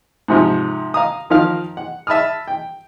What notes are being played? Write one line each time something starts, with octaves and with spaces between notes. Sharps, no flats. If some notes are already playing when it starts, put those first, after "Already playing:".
G#2 C3 F3
F5 A#5 D#6
D#3 F3 A#4 F5 F6
F#5
E5 A5 B5 D#6 F6
G5